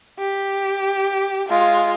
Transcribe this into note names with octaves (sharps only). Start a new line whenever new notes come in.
G4
G#3 F4